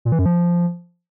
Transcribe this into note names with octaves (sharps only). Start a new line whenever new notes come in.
A#2
E3
F#2
F3